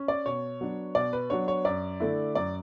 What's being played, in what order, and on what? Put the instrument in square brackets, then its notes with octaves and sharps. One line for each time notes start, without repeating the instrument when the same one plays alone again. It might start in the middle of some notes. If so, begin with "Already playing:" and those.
Already playing: [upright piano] C#4
D5
B2 C#5
F#3 B3 D4
B2 D5
B4
F#3 B3 D4 C#5
C#5
F#2 D5
D3 A3 E4
F#2 D5